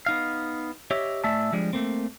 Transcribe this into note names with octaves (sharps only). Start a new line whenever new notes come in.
B3 D#4 F5
G4 C#5 D#5 E5
A2 A3 D5 E5 G#5 A5
F3 G3 G#3 D4
A3 A#3 C4